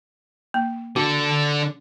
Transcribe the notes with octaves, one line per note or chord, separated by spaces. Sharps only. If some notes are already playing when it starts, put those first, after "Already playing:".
A#3
D3 D4 F#4